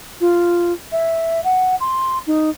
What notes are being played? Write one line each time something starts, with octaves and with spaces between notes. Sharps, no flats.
F4
E5
F#5
C6
D#4